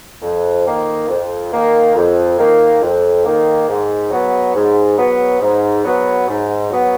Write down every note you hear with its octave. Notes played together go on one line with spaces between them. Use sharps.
F2
D#3 A#3
F2
D#3 A#3
F2
D#3 A#3
F2
D#3 A#3
G#2
F#3 B3
G#2
F#3 B3
G#2
F#3 B3
G#2
F#3 B3